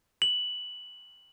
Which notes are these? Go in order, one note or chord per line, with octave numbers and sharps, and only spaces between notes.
F#7